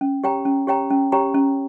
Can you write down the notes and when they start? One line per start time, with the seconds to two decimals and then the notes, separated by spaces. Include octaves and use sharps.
0.01 C#4
0.24 G4 C#5 G5 A#5
0.45 C#4
0.67 G4 C#5 G5 A#5
0.90 C#4
1.12 G4 C#5 G5 A#5
1.35 C#4